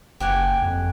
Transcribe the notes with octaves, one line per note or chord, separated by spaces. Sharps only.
F#1 G4 F#5 G#5
F2